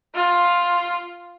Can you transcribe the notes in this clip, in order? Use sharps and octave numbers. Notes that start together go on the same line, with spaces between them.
F4